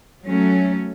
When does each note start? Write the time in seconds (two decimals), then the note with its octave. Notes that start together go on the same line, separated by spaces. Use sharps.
0.25 F#3 A3 C#4